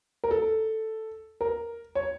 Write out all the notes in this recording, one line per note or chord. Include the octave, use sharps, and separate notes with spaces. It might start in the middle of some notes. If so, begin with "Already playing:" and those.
A#4
A4
A#4
C#5